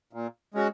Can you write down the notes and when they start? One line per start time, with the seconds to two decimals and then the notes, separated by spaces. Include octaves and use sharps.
0.13 A#2
0.54 G#3 C#4 F#4